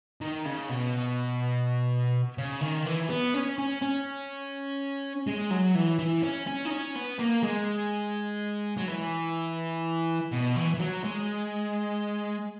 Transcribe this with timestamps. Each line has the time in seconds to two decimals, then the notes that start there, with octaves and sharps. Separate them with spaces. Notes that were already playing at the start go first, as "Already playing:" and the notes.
0.21 D#3
0.45 C#3
0.69 B2
2.38 C#3
2.61 D#3
2.86 E3
3.10 B3
3.34 C#4
3.58 C#4
3.82 C#4
5.27 G#3
5.51 F#3
5.75 E3
5.99 E3
6.22 C#4
6.47 C#4
6.65 D#4
6.70 C#4
6.95 B3
7.19 A#3
7.43 G#3
8.78 F#3
8.88 E3
10.32 B2
10.56 E3
10.74 E3
10.80 F#3
11.04 G#3